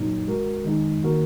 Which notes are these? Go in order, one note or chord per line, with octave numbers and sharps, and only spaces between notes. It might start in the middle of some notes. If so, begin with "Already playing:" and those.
Already playing: A#2 F#3 D#4
G#3 F#4 A#4
D#3 G#3 D#4
D#3 A#3 F#4 A#4